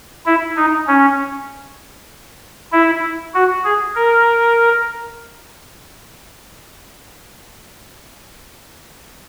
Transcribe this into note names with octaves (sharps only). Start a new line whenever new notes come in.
E4
D#4
C#4
E4
F#4
G#4
A#4